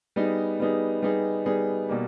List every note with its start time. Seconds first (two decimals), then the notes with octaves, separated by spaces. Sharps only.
0.16 G3 B3 D#4 G#4
0.60 G3 B3 D#4 G#4
1.03 G3 B3 D#4 G#4
1.46 G3 B3 D#4 G#4
1.89 B2 G3 A#3